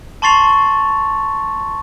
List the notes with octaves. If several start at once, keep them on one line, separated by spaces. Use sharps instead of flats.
A5 C6 C#6 A6 C7 F7